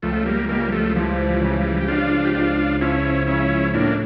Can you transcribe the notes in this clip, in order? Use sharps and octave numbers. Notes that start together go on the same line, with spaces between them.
C#2 F3 A3
G3 A#3
C#2 G3 A#3
F3 A3
E3 F3 G3
C#3
G4
C#2 D4 F4
G4
C#2 D4 F4
F3 C#4 E4
C#3 C#4 E4
A2 A#3 D4